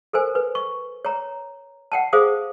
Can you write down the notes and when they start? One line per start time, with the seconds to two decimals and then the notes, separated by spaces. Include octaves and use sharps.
0.13 A4 A#4 C5 G#5
0.35 B4
0.55 C#6
1.05 C#5 A#5
1.92 F#5 G5 A5
2.13 G#4 C5 F5 D6 D#6